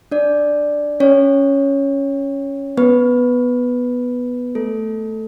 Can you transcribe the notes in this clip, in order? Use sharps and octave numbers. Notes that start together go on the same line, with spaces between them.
D4 D5
C#4 C#5
B3 B4
A3 A4